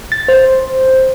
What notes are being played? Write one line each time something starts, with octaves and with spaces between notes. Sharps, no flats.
A6
C5